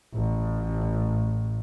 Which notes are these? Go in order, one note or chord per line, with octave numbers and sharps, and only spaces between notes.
A1 A2